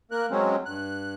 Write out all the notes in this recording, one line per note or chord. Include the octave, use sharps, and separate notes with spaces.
A#3 A#4 F#6
F#3 G#3 C4 C#4
G2 F#6